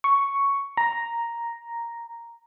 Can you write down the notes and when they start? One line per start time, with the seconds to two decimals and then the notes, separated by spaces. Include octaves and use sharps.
0.04 C#6
0.77 A#5